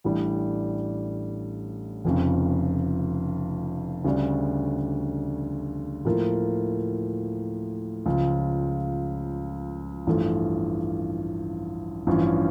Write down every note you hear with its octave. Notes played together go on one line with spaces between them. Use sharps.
A1 A2 G3 D4
F1 F2 C#3
D2 C#3 G3 D4
A2 F3 A#3
C#2 C#3 F3
A1 G2 F3 A3
A1 G2 F3 C#4